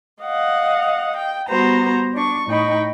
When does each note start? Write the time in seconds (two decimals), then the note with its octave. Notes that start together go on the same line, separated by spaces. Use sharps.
0.22 D#5 F5 F#5
1.16 G5
1.49 G3 B3 F#4 C5 A#5
2.14 D4 C#6
2.47 A2 D#4 D#5 G5 B5 C#6